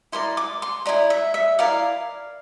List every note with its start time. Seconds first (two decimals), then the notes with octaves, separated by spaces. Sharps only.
0.12 E4 A#4 D5 C6
0.37 D6
0.62 C6
0.86 E4 A#4 D5 A#5
1.10 E5
1.34 E5
1.59 E4 A#4 D5 F5